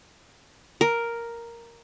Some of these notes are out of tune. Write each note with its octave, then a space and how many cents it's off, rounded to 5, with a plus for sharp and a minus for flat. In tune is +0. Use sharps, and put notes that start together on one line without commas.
A#4 +0